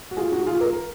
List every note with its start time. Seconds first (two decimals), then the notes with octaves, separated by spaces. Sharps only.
0.11 F#4
0.17 F4 G#4
0.32 D#4 F#4
0.47 F4 G#4
0.61 A#4